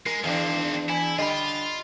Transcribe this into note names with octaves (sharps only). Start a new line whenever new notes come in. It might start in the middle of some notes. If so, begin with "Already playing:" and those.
G#3 A#4
E2 D#3 C4 D4
E4 G#5
D3 G3 F4 D#5 B5